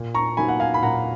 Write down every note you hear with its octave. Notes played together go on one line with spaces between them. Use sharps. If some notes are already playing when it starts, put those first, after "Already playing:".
Already playing: A#2
A#5 C#6
F#3 A#3 D#4 G#5 B5
F#5
F5 G#5
B5
A#2 F#5 A#5